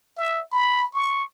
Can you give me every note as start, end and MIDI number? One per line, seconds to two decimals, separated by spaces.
0.17 0.42 76
0.52 0.88 83
0.93 1.23 85